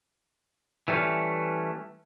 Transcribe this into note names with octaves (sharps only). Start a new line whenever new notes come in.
E3 G3 A3 B3 C#4